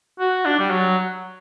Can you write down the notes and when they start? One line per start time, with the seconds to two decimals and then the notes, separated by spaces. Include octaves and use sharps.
0.20 F#4
0.46 D4
0.59 G3
0.71 F#3